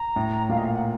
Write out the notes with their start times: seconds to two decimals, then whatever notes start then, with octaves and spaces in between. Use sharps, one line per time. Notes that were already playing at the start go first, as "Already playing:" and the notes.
Already playing: A#5
0.16 A2
0.49 A#2 F5
0.58 D#5
0.65 F5
0.74 F#5